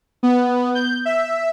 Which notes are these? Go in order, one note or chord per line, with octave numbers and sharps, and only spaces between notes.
B3
G6
E5